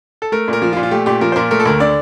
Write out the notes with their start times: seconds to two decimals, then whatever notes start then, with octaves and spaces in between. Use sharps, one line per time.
0.22 A4
0.32 A3 A#4
0.48 A#2 A#4
0.62 F3
0.73 F4
0.77 A#2
0.83 F4
0.91 A3 G4
1.06 A#2 G4
1.21 F3 A#4
1.32 C5
1.36 A#2 A#4
1.51 A3 A#4
1.60 A4
1.66 D2 A#4
1.80 D3 D5